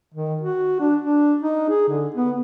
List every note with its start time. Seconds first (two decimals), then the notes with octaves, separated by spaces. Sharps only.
0.14 D#3
0.41 F#4
0.80 D4
1.01 D4
1.42 D#4
1.70 G#4
1.89 D3
2.14 B3